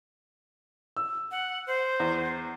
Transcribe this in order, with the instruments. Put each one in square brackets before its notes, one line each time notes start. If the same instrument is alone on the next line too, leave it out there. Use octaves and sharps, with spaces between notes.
[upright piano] E6
[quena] F#5
C5
[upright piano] E2